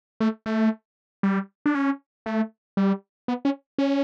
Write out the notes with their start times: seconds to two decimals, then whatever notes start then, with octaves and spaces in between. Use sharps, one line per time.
0.20 A3
0.46 A3
1.23 G3
1.66 D4
1.75 C#4
2.26 A3
2.77 G3
3.28 B3
3.45 C#4
3.78 C#4